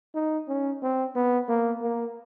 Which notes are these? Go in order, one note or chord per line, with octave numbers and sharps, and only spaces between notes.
D#4
C#4
C4
B3
A#3
A#3